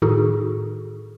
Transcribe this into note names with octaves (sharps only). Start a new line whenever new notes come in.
A2 D#3 D#4 F#4 G#4 A4